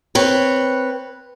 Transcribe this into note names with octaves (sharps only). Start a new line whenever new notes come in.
C4 B4 C#5